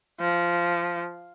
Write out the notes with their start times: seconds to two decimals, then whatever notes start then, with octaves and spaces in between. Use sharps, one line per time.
0.20 F3